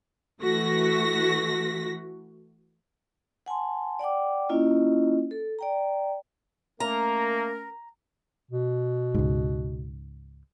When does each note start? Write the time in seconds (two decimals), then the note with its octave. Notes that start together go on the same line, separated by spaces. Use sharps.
0.42 E3 A3 F#4 A#6 B6
3.46 F#5 G#5 A5 C6
3.99 D5 F#5 G5 D6
4.49 A#3 C#4 E4 F4 D#5
5.31 A4
5.59 D5 G5 A#5
6.80 A3 A#3 C#4 A#4 A#5
8.51 B2
9.14 C#2 G#2